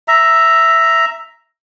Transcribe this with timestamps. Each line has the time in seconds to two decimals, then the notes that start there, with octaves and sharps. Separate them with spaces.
0.08 E5 A#5